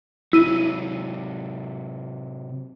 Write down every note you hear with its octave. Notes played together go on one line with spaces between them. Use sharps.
C3 F#3 E4 D#7